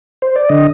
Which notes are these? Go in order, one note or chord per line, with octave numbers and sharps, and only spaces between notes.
C5
D5
D3 D#5